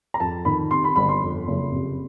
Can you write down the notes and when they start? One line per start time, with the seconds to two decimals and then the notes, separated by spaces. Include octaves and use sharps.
0.14 A#5
0.20 F2 A5
0.45 D#3 B5
0.71 C3 C6
0.84 B5
0.96 G1 B5
1.09 C6
1.22 F2
1.48 F#1
1.72 C3